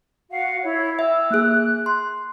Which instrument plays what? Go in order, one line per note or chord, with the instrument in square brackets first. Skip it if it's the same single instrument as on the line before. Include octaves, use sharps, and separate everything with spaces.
[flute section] F#4 F5 F#5
E4 C#5
[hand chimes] E5 [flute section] G5 E6
[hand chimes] A#3 G#4 [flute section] F#6
[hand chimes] C6